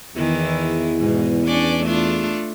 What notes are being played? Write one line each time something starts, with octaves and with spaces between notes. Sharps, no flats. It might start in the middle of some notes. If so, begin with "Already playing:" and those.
E2 D#3 E3 E4
G#2 B2
C#4 D4 D5
A3 D4 F4